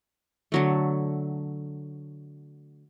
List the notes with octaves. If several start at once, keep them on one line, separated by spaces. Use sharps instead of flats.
D3 F#3 A3